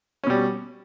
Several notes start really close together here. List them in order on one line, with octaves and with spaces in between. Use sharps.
C#4 B2 G3